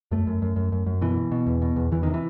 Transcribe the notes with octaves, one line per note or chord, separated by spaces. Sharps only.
F#2 A3
F#2
F#2
F#2
F#2
F#2
B2 E3
B2
B2
E2
B2
E2
E2 E3
C3 D#3
E3